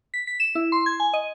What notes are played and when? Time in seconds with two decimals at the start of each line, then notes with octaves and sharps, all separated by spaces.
0.14 B6
0.27 B6
0.40 E7
0.55 E4
0.72 C6
0.86 G#6
1.00 G#5
1.13 D#5